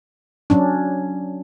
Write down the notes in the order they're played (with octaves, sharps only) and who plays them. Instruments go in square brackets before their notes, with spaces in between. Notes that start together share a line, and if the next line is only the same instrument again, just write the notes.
[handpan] F#3 C#4 D4